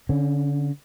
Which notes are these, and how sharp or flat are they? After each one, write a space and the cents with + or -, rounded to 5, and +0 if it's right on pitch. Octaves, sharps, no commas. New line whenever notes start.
D3 -25 C#4 +0